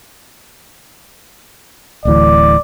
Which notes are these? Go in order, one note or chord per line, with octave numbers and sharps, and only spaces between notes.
D1 D2 E3 D5